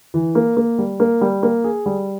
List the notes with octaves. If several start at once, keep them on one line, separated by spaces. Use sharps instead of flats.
E3
A#3
A#3
G3
A#3
G3
A#3
G#4
G3